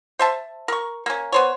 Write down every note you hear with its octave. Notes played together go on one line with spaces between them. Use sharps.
C5 E5 A5
A#4 C#6
A#3 C#4
B3 C5 C#5